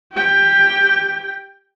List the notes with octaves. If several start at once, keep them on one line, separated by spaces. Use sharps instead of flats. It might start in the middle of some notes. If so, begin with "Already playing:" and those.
G4 G5